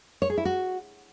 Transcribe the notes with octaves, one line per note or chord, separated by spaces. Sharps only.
C#5
G#4
E4
F#4